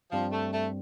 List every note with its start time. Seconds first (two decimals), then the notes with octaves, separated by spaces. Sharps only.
0.12 G2 F3 G3 C4
0.32 A3
0.52 A3